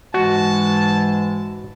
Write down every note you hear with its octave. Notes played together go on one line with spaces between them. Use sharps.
G#2 E3 G#3 F#4 A5